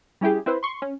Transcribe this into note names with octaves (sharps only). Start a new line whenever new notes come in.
G3 C#4 E4 G4 G#4
C4 E4 B4 C5
C6 C#6
C#4